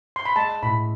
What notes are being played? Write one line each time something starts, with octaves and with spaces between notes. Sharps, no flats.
C6
B5
G#3 A5
A2 B5